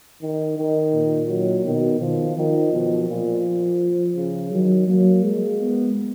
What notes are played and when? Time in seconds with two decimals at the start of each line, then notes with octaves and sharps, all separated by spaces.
0.22 D#3
0.57 D#3
0.94 A#2
1.29 F#3
1.65 B2 D#3
2.01 D#3 F3
2.37 D#3 F3
2.72 B2
3.08 A#2 F3
4.16 C#3
4.52 D#3 F#3
4.87 F#3 A#3
5.23 G#3
5.59 B3